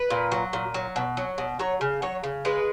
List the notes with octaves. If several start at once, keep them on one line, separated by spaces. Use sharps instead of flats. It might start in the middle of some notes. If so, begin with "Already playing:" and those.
Already playing: B4
A#2
F#3
A#2
F#3
B2
F#3
B2
F#3 C#5
C#3
F#3 C#5
C#3
G#3 B4